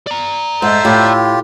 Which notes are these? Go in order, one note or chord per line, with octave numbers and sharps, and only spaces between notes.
D5 A#5
G#2 A3 C5 E6
A2 F4 G4